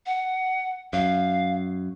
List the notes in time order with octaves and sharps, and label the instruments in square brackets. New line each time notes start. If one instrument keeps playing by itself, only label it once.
[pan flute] F#5
[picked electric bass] F#2 [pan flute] F5